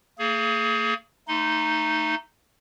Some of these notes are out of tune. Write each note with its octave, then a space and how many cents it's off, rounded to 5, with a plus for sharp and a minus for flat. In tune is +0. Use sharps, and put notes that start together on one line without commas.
A#3 -40 G#4 +25
A3 +20 D#4 +0 C6 -35